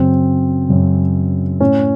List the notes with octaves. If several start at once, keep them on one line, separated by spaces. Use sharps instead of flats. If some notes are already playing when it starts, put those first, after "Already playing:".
Already playing: F#2 C#3 C4
F#2 C#3
A2 C#4